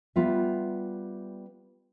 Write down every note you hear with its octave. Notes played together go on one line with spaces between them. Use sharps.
G3 B3 F4 E5